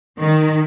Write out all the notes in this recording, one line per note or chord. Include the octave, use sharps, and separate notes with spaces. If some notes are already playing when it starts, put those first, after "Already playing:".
D#3